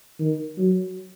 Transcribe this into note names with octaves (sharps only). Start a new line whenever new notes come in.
D#3
F#3